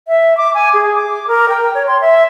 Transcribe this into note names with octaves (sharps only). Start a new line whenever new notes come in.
E5
D6
G#5
G#4
D6
A#4
G5
C#5
C6
E5